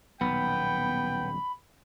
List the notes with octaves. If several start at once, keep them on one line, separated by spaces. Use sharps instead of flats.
D#1 B1 B3 G5 B5